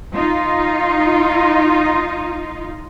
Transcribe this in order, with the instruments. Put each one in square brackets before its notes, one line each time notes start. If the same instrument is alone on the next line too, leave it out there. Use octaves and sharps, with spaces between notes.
[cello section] D#4 F4